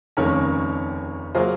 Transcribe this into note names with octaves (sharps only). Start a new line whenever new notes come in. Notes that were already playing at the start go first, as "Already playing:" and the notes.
F1 D#2 D#3 A#3 C#4 A#4 C#5
F#3 A#3 F4 G#4 C5